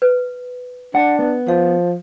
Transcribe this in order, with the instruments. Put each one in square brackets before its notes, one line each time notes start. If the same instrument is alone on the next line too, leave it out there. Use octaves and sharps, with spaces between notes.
[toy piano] B4
[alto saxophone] D4 [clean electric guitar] F#5
[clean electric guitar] B3
[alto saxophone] F3 [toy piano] F5